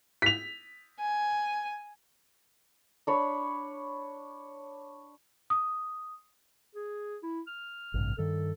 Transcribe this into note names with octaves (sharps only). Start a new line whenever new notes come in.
B6 F7
G#5
D4 C#5 B5
D#6
G#4
E4
F6
A1 G2 C3
G2 D#3 A4